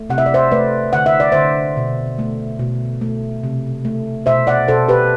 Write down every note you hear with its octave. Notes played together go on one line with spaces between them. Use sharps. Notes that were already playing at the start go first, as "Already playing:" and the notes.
Already playing: A3
C3 F#5
E5
D5
C5 E5
A3 B4 D5
D3 F#5
E5
D5
D3 C5 E5
B2
A3
B2
A3
C3
A3
B2 C5 E5
D5 F#5
B2 A4 C5
G4 B4